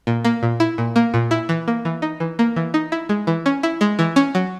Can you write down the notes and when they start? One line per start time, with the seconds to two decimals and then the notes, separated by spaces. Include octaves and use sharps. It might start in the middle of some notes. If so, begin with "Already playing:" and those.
0.07 A#2
0.25 A#3
0.43 A#2
0.60 E4
0.78 A#2
0.96 A#3
1.14 A#2
1.31 E4
1.49 E3
1.68 A#3
1.85 E3
2.02 D#4
2.20 E3
2.39 A#3
2.56 E3
2.74 D#4
2.92 E4
3.09 G#3
3.27 E3
3.46 C#4
3.63 E4
3.81 G#3
3.99 E3
4.16 C#4
4.35 F#3